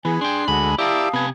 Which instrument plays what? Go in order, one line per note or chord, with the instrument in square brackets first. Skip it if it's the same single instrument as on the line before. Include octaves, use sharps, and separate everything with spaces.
[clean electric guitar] E3 [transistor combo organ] B3 [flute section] G#4 G#5
[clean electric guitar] D4 G5 [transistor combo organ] C6
[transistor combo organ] D2 G#3 [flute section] F#4 A4 [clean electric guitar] B5
[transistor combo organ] E4 D5 [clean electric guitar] G4 A#4 [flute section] F5 A5 D#6
[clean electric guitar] C3 G#5 [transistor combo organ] B3